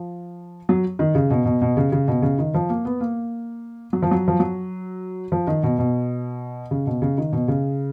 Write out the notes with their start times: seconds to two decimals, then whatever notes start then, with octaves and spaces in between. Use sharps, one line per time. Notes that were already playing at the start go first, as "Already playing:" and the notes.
Already playing: F3
0.69 F#3
0.99 D#3
1.15 C#3
1.30 B2
1.45 B2
1.62 B2
1.77 C#3
1.92 C#3
2.08 B2
2.22 C#3
2.39 D#3
2.54 F3
2.70 A#3
2.85 B3
3.01 A#3
3.93 F#3
4.03 F3
4.11 F#3
4.28 F3
4.40 F#3
5.32 F3
5.47 D#3
5.63 B2
5.79 B2
6.71 C#3
6.87 B2
7.02 C#3
7.18 D#3
7.32 B2
7.48 C#3